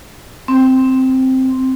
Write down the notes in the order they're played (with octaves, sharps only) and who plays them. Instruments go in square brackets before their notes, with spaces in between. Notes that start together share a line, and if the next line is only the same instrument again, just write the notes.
[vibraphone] C4